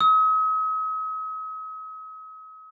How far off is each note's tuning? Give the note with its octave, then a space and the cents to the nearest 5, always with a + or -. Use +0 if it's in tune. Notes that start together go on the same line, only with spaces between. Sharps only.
D#6 +45